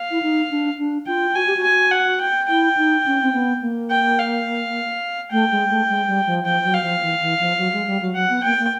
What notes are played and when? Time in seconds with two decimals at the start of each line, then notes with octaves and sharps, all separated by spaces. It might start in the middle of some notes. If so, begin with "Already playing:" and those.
Already playing: F5
0.11 E4
0.22 D#4
0.50 D4
0.78 D4
1.07 F4 G5
1.35 F#4 G#5
1.47 G4
1.57 F#4
1.63 G#5
1.91 F#5
2.21 G5
2.48 E4 G5
2.77 D#4
3.06 C#4
3.22 C4
3.33 B3
3.61 A#3
3.90 G5
4.19 F5
5.32 A3 G5
5.52 G#3
5.70 A3
5.89 G#3
6.08 G3
6.27 F3
6.45 F3 G5
6.65 F#3
6.74 F5
6.83 F3
7.02 E3
7.21 E3
7.40 F3
7.58 F#3
7.73 G#3
7.87 G3
8.02 F#3
8.16 F#3 F#5
8.30 B3
8.44 A#3 G5
8.58 A#3